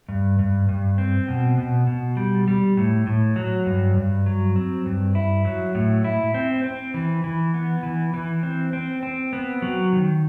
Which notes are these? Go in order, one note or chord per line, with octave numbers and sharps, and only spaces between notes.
G2
G2
G2
C4
B2
B2
B2
G3
G3
A2
A2
F#3
G2
G2
F#3
C4
G2
E4
F#3
A2
E4
C4
C4
E3
E3
B3
E3
E3
C4
C4
C4
B3
F#3
D#3